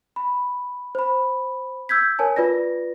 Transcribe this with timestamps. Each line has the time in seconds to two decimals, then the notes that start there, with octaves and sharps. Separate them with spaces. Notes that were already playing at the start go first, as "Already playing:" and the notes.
0.16 B5
0.95 C5 B5
1.89 E6 G6 G#6 B6
2.19 A#4 C#5 G#5 A5
2.36 F4 B4 D5 A#6